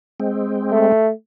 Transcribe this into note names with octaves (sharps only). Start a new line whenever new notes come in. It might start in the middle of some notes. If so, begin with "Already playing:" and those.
G#3 C4
A3